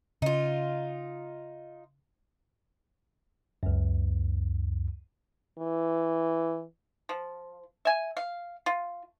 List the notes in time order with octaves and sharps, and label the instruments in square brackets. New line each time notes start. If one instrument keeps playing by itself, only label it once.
[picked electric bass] C#3 [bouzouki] D#4 F4
[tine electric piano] C#2 F#2
[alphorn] E3
[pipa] F3
E5 G#5
F5
F4